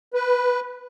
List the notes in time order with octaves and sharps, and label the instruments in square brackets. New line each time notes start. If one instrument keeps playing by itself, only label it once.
[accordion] B4